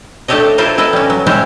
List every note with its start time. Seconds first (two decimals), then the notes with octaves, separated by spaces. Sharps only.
0.28 A3 D4 G4 A4 C#5 D#5
0.58 E4 F4 A4 A#4 C5
0.78 E4 A4 B4 D#5
0.93 G3 C#4
1.10 F#3
1.26 G3 G#3 C4 C#4 E4 G4